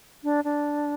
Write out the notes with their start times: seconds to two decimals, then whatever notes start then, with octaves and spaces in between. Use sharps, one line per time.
0.24 D4
0.44 D4